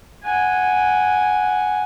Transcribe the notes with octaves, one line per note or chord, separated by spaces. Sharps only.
F#5 G#5